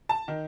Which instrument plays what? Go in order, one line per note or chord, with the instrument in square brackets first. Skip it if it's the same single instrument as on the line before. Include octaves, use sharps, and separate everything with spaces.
[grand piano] A5
D#3